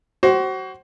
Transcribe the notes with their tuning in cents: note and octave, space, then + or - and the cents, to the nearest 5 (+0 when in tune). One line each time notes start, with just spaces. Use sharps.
F#4 +30 C5 +25